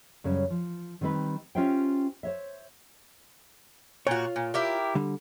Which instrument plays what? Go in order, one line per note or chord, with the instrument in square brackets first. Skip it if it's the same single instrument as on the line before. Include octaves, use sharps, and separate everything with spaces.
[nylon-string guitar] F#2 C#3 G3 C#4
F3
D#3 G3 C4 D#4 B4
C#4 F4 G4 C5 E5 G5
C5 C#5 E5
[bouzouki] A#2 F#4 [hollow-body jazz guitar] F4 C#5
[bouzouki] A#2
E4 G4 A#4
[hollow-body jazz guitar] D3 G3